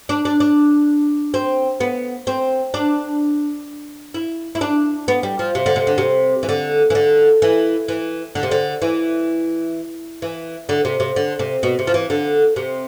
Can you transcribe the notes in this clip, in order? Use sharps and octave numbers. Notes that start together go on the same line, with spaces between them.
D4
D4
D4
C4
B3
C4
D4
E4
E4
D4
B3
G3
F3
C3
D3
C3
D3
C3
E3
D3
E3
D3
E3
E3
D3
C3
D3
E3
E3
D3
C3
C3
D3
C3
B2
C3
F3
E3
D3
C3